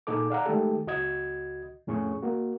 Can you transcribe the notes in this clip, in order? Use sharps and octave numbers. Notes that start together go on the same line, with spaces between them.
A#2 D#4 G#4 A4 D6
D5 F5 F#5 A#5
D#3 G#3 A3 G4 A4
C#2 F#4 D#5 G#6
F2 A2 C#4 G#4 C#6
A#3 F#4